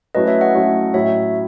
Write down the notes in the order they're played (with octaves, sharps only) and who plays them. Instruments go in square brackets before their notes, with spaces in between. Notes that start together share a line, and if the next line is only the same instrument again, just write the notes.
[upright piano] F#3 A3 C#4 E4 [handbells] B4 D#5
[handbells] C#5 E5
D#5 F#5
[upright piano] F#3 A3 C#4 E4
[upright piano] A2 F#3 C#4 E4 [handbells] C#5 E5